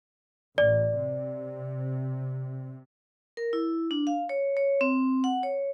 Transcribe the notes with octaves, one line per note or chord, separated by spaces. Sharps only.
A1 D5
C3
A#4
E4
D4
F5
C#5
C#5
C4
F#5
C#5